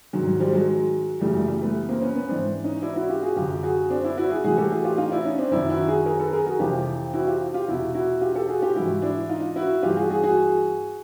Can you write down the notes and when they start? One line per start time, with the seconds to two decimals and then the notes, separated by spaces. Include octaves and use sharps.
0.13 G#2 D#3 F#3
0.26 F#3
0.39 F3 G3
0.53 F#3 G#3
1.20 F#2 C#3 E3 G3 A3
1.34 G3 A3
1.48 G3 A3
1.61 A3 B3
1.89 A#3 C4
2.01 B3 C#4
2.15 B3 C#4
2.28 G#2 E3 C4 D4
2.64 C#4 D#4
2.82 D4 E4
2.96 E4 F#4
3.09 F4 G4
3.22 F#4 G#4
3.36 F#2 D3 F4 G4
3.63 F#4 G#4
3.90 C4 D4
4.04 D4 E4
4.17 E4 F#4
4.30 F#4 G#4
4.44 A2 E3 F#4 G#4
4.58 G4 A4
4.72 F#4 G#4
4.84 F4 G4
4.98 D#4 F4
5.12 D4 E4
5.25 C#4 D#4
5.38 C4 D4
5.51 F#2 D#3 D4 E4
5.70 E4 F#4
5.88 F#4 G#4
6.06 G#4 A#4
6.20 A4 B4
6.32 G#4 A#4
6.46 F#4 G#4
6.59 F2 C3 E3 F4 G4
7.13 E4 F#4
7.27 F4 G4
7.54 F4 G4
7.68 E2 B2 E4 F#4
7.94 E4 F#4
8.21 F4 G4
8.35 G4 A4
8.48 F#4 G#4
8.61 F4 G4
8.76 G#2 E3 E4 F#4
9.02 D4 E4
9.29 D#4 F4
9.56 E4 F#4
9.83 G2 E3 F4 G4
9.96 F#4 G#4
10.10 F#4 G#4
10.23 F#4 G#4